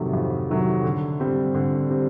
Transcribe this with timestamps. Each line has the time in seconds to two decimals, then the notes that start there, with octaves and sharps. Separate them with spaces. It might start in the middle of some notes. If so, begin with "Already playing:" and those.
Already playing: F2 C3 D#3 F#3 A3
0.13 F2
0.49 C3 D#3 F#3 A3
0.84 D3
1.20 G3 C4
1.55 D3
1.90 G3 C4